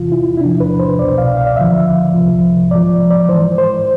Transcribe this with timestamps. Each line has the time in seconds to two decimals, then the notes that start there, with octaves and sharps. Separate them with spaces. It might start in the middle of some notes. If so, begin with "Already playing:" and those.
Already playing: E2 C3 E3 F4
0.12 E4
0.37 E4
0.41 E2 C3 F3 D4
0.60 B4
0.79 C5
0.99 C2 B2 D5
1.18 F5
1.37 F5
1.47 D5
1.56 D2 D3 F3 E5
2.14 C2 C3 F3
2.71 G#2 F3 D5
3.10 D5
3.29 G#2 E3 C5
3.58 C5